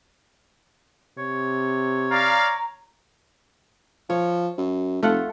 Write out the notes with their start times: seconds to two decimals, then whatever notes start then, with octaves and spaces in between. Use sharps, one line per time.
1.18 C3 C#5
2.10 D5 F5 A#5
4.10 F3 C#5
4.58 F#2
5.03 F1 A3 F4 F#5